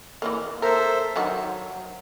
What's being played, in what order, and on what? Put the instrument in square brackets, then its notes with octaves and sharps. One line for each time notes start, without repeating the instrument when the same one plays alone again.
[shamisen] E3 F#3 A#3
[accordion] A4 C5 E5 [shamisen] A#4
[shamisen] D3 D#3 F#4 [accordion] F#3